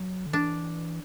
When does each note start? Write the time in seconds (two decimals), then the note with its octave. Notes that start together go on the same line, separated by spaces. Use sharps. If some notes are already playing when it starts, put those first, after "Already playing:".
Already playing: F#3
0.26 D3
0.33 E3 D4